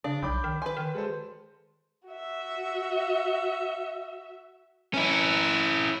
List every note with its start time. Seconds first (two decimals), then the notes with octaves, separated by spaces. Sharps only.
0.04 C#3 D4
0.23 B1 B5 D6 G6
0.44 D#3
0.62 B4 G#5 C6
0.77 D#3
0.95 G#3 A4 C5
2.08 F#4 E5
4.94 C#4 E4